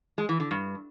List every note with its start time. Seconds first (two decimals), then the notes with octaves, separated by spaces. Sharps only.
0.18 G#3
0.29 E3
0.40 D3
0.51 G2